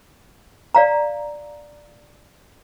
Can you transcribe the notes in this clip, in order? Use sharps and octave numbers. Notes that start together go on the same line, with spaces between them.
D5 F5 A#5